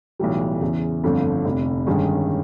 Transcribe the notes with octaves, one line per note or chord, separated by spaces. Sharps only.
B1 A2 E3 G3
E2 C#3 E3
G1 F2 D3 F3 A3
F1 F2 C3
G1 G2 D#3 G#3 C#4